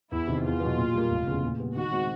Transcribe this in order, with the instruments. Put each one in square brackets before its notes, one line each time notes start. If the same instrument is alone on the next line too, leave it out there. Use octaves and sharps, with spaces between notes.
[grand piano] E2 [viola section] E4
[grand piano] C3 D#3
[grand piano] E2 [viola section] F4
[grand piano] B2 F#3 B3
A#2
G3 A#3
F1
E2 C#3
A#2
G3 B3
[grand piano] D#3 [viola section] F#4
[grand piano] G#3 C4